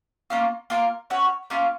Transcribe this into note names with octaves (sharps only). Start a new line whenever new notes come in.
A#3 C#4 F4
A#3 F4 A#4
C#4 F#4 C#5
A#3 C#4 F4